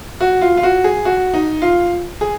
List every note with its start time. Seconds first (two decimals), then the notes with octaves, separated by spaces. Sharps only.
0.21 F#4
0.42 F4
0.57 F4
0.63 F#4
0.84 G#4
1.05 F#4
1.34 D#4
1.62 F4
2.21 G#4